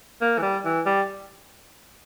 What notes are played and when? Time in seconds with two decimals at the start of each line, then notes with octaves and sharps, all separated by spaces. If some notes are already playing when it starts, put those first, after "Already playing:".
0.21 A#3
0.38 E3
0.42 G3
0.65 E3
0.86 G3